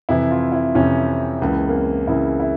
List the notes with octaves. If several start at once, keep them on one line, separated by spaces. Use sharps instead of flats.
F2 C3 E3 E4
F4
E4
F2 C3 E3 C#4
C#2 C#3 E3 A#3
A#3
C4
C#2 C#3 E3 E4
E4